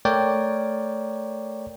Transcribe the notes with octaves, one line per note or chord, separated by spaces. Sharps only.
A3 A#4 C#5 D5 G5